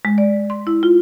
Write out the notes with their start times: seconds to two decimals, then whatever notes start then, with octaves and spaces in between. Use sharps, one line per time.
0.05 G#3
0.18 D5
0.50 C6
0.67 E4
0.83 F4